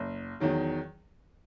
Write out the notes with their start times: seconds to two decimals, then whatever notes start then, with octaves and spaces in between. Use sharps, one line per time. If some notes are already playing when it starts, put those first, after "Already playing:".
Already playing: F#1
0.40 E2 D#3 F#3